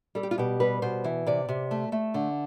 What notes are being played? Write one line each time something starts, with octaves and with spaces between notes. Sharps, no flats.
G3 A4
G4
F4
B2 G4
G3 B4
B2 C5
E3
C3 D5
C3
A3
A3
D3